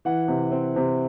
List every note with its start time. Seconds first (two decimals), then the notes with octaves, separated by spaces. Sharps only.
0.05 E3 F#5
0.28 C3
0.52 C4
0.76 C3